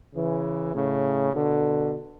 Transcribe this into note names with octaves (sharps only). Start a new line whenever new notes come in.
C#3 E3
A2 C#3
B2 D3